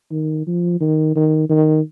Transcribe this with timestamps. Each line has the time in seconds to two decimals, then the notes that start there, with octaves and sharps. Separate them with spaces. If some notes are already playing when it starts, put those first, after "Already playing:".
0.11 D#3
0.47 F3
0.80 D#3
1.15 D#3
1.49 D#3